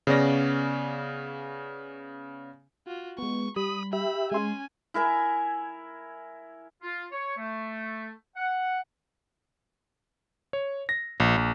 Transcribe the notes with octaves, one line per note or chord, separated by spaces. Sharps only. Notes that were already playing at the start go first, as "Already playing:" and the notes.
C#3 B3 C#4 D5 A#6
F4 F#4
G#3 B3 C#6
G3 B5 D#6
G4 E5 B5
G#3 C#4 G#5 C6
E4 A#4 E5 G#5
F4
C#5
A3
F#5
C#5
A#6
A#1
A#1